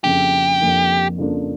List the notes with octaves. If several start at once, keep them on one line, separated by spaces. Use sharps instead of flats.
F2 C#3 F3 A#3 D4 G4
F2 C#3 F3 A#3 D4
F2 C#3 F3 A#3 D4